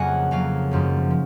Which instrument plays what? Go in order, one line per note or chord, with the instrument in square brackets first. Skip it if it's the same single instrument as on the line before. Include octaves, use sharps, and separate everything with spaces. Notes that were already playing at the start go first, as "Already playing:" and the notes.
Already playing: [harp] F2 C#3 F#3 A#3 D#5 F#5 G#5
F2 C#3 F#3 A#3 F5
G#1 F#2 F3 G#3
F3